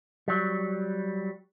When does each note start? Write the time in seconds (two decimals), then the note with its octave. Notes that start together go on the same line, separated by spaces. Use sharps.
0.28 F#3 G3